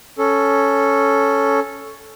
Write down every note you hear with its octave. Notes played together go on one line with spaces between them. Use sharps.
C#4 A4